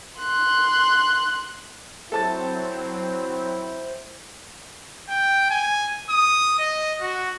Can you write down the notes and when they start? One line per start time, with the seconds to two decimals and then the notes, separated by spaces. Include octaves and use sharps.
0.20 C6 F#6
2.12 F#3 C4 E4 A4 C5 A5 A6
5.09 G5
5.50 G#5
6.10 D#6
6.59 D#5
7.01 F#4